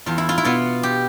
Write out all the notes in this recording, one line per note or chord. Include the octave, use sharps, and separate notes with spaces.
E2 F4
E4
F4
E4
B2 B3 F4
G4